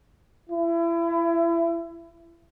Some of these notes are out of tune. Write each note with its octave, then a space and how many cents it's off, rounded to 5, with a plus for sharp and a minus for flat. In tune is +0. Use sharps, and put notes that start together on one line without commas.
E4 +30